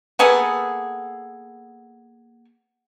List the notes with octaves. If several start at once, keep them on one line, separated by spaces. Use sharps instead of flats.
A#3 B3 G#4 A4